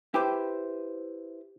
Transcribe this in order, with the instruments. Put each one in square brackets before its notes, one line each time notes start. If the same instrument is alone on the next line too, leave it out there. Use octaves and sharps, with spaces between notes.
[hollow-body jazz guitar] E4 B4 C5 [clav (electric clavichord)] G4